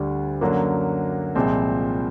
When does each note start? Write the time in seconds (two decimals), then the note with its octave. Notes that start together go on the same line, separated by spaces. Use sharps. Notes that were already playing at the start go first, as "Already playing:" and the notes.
Already playing: D2 D3 G3
0.41 F#2 D3 F#3 A#3
1.35 C2 A#2 F3 G#3 C4